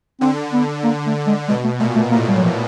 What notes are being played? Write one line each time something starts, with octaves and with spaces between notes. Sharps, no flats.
D3 C4
B3
A#3
A3
G#3
B2 G#3
A3
A#2 A3
A3
A2 A#3
G3
F#3
F3